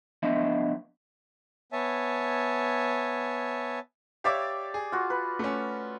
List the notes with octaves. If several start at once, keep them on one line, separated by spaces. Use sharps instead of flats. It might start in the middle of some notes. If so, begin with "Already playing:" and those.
F3 B3 D4 D#5 E5
B3 C#5 E5 G#5 A5
G4 C#5 D5 E5 F5 D6
G#4
F4 F#4
B4
A3 C#4